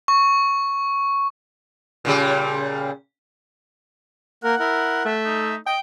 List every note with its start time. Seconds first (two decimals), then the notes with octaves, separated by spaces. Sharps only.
0.08 C#6
2.05 A#2 C#3 G3
4.44 A#3 A#4 F#5
4.59 E4 A#4
5.05 A3 E5
5.25 D#4
5.67 D#5 G5